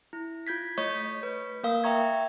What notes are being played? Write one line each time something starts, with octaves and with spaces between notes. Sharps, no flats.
E4
F4 G6 G#6 B6
A3 C#5 D#5 C#6 G6 B6
B4
A#3 A#4 F5 D#6
E5 G5 A#5 C#6 G#6